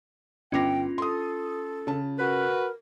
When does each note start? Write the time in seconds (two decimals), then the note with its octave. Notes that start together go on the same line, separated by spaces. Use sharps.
0.52 G1 C#4 F4 G5 D6 A#6
0.98 A4 C6 D#6
1.87 C#3 A5
2.17 F#4 A#4 B4